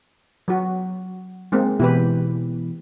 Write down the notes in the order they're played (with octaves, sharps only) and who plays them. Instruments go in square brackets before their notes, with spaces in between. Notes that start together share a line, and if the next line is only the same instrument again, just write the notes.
[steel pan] F#3 F#4
G#3 A#3 C4
[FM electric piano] B2 E3 [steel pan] E4 G4 B4